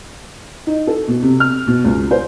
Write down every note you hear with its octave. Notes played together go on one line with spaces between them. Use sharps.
D#4
A4
B2
C3
F6
B2
C#2
C5